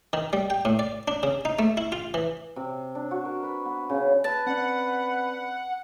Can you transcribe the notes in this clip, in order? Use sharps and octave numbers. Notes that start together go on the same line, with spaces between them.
D#3
G3
G5
A2
D5
D4
C#3
D#4
A3
E4
F4
E3
C3
D4
F#4
A#4
B4
B3
C#3
B4 A5
C4 C#4 D5 F#5